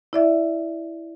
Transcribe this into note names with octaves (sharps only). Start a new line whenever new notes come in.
E4 D5 E5